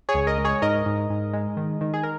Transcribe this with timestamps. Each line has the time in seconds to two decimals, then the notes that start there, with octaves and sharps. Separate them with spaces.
0.09 G#4 C#5
0.14 C#2
0.27 A#4 D#5
0.38 G#3
0.44 G#4 C#5
0.62 G#2 A#4 D#5
0.86 G#2
1.10 G#2
1.33 G#3
1.57 D#3
1.81 D#3
1.94 G#4
2.03 A#4